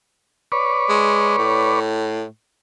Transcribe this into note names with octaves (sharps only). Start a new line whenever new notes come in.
B4 C#5 D5
G#3
A2